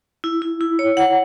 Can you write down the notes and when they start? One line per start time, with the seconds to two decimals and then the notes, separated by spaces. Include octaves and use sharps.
0.24 E4
0.42 E4
0.61 E4
0.79 C#5
0.97 F#5